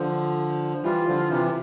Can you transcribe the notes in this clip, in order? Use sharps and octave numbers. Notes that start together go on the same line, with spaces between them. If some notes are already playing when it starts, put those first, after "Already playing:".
Already playing: D3 F3
E3 G3 F4
D3 F3
C3 E3